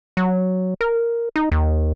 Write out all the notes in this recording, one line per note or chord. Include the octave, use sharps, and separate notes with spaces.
F#3
A#4
D#4
D#2